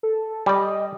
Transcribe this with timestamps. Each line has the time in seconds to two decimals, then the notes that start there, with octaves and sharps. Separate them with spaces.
0.03 A4
0.46 G3 D5 D#5